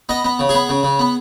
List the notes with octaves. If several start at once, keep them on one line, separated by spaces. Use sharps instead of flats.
B3 D#5
B3
C#3
B3 G#4
C#3
C#3
B3